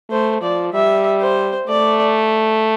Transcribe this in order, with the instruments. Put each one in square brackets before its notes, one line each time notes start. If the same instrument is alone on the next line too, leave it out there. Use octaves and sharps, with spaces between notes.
[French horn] A3 [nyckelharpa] C5
[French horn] F3 [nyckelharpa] D5
[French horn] G3 [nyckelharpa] E5
[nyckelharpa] C5
[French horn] A3 [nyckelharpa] D5